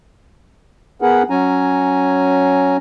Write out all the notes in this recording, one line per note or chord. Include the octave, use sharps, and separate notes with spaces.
B3 G#4 A#4 B4 F#5
F#3 C#4 G#5 A#5